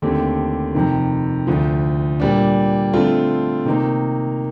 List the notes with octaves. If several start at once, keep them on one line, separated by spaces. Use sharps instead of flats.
D#2 D3 A3 C4 G4
F2 C3 D#3
D2 D3 F3
A#2 G3 D4
D3 A3 C4 F4
C3 D#3 A#3 D#4